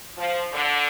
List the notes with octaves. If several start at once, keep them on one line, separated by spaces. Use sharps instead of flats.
F3
D3